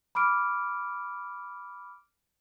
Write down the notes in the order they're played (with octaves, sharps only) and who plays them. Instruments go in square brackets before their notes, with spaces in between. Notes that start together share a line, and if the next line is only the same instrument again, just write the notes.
[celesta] B5 D6 F6 D7